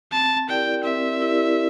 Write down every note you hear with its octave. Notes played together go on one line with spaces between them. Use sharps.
C4 A5
E4 G4 A#4 D5 G5
C4 E5
E4 G4 A#4 D5